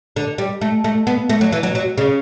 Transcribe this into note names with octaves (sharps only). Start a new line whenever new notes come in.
D3
G3
A3
A3
B3
A3
F#3
E3
F#3
F#3
C#3